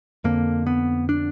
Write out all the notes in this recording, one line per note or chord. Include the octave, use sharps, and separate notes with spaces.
F2 D3 A#3
B3
D4